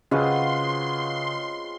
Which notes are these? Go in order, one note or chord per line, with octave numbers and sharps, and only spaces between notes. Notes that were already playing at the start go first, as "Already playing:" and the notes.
C#3 G#3 C4 C#4 F4 F#4 B4 C6